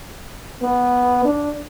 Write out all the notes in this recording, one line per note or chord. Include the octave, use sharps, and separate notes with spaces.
B3
D4